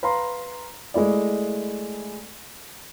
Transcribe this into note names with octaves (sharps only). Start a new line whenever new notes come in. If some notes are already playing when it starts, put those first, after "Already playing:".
B4 F5 A#5 C6
G#3 A3 E4 D5